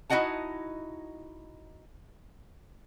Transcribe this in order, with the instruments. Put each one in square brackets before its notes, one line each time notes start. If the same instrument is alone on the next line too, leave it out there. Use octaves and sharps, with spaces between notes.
[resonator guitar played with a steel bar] D#4 E4 F#4 D#5 F#5 A5